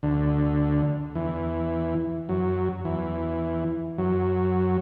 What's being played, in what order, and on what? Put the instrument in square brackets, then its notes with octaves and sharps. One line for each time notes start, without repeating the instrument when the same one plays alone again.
[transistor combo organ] D2 D3
E2 E3
F#2 F#3
E2 E3
F#2 F#3